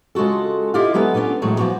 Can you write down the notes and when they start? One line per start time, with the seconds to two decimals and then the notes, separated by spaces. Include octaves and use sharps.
0.15 C#3 G#3 F4 F#4 A4
0.74 E4 F4 G4 D#5 F5
0.94 F#3 G#3 B3 A4 B4
1.14 B3 C#4 D4 F4 B4
1.42 A2 E3 F#3 G#3 A3
1.58 E3 F3 B3 F#4